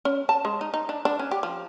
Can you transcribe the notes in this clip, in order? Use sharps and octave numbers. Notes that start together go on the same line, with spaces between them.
C#4
A5
G#3
D#4
D#4
D4
D4
C#4
G4
F3